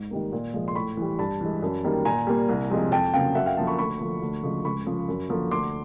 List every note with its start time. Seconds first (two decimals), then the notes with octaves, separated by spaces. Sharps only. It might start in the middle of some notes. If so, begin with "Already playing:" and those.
Already playing: G#2
0.11 D#3 G3 A#3
0.32 A#2
0.54 F3 G#3
0.68 C6
0.75 A2 B5 C#6
0.97 E3 G3
1.19 G2 A5 B5
1.41 E3 G#3
1.63 F#2
1.84 D#3 G3 A#3
2.05 A#2 G#5 A#5
2.27 G3 A#3
2.49 C2
2.70 C3 F3 G#3
2.92 F2 G5 A5
3.14 C#3 F#3 A#3 F5 G5
3.35 F#2 E5 F#5
3.46 F5 G5
3.56 D3 F3 A#3 G5 A5
3.67 B5 C#6
3.78 D2 B5 C#6
3.99 D3 F3 A#3
4.22 D2
4.43 C#3 F3 G#3
4.65 C#2 B5 C#6
4.86 C#3 F3
5.09 F#2
5.30 D3 F3 A#3
5.51 D2 C6 D6